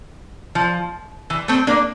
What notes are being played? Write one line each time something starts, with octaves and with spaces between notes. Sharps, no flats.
F3
E3
A3 C4
A#3 D4